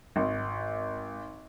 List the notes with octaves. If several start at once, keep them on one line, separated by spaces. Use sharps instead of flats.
G#1